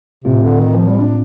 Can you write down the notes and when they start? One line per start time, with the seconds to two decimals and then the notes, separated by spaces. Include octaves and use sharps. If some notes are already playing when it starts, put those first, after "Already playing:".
0.24 A2 C3 A3 C4 F4
0.43 D3
0.61 D#3
0.74 F3
0.87 G3
0.99 D4